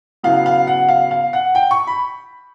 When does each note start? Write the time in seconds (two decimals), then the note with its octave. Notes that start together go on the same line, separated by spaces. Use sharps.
0.23 C#3 F#3 B3 E4 F5
0.46 F5
0.67 F#5
0.89 F5
1.11 F5
1.33 F#5
1.55 G5
1.71 C#6
1.87 B5